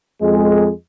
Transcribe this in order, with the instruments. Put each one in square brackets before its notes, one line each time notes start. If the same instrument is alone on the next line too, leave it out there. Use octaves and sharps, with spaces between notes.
[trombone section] F2 G#3